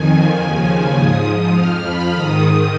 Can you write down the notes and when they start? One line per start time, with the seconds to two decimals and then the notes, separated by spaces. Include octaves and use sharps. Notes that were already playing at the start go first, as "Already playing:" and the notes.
Already playing: F2 D#3 G#5
0.39 D#2 C#3 F3
0.97 G#2 F3 D#6
1.54 F2 F3 F6
1.83 B5
2.12 G#2 D#3 D#6